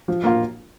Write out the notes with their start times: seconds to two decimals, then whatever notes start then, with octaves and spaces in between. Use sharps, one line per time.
0.08 F3
0.24 A#3 F4